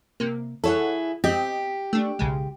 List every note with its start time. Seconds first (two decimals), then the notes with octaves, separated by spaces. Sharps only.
0.20 C3 A#3
0.64 E4 G#4 A4 C#5 F#5
1.24 C4 G4 D#5 G5
1.93 A3 D4
2.19 B1 C#3 G#3